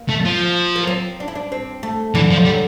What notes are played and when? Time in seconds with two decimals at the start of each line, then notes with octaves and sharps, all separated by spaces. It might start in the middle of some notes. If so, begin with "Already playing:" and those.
Already playing: A#3
0.09 A3
0.25 F3
0.76 A#3
0.87 C4
1.20 D4
1.28 E4
1.35 D4
1.52 C4
1.83 A3
2.15 D3 E3
2.31 F3
2.45 G3